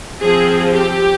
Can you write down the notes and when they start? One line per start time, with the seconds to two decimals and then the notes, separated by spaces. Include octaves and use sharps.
0.22 F3 C4 G#4
0.73 G4